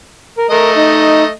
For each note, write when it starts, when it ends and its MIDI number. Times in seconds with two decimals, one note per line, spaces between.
0.38 0.47 70
0.50 1.30 57
0.50 0.70 70
0.50 1.30 75
0.76 1.24 63